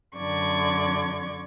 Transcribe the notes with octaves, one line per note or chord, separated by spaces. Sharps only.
F#2 D3 D5 C#6 G#6